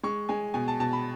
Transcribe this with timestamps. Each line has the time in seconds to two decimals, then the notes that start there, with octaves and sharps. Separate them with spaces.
0.03 G#3 C#6
0.29 G#3 G#5
0.54 B2 G#5
0.68 A5
0.80 B2 A5
0.93 B5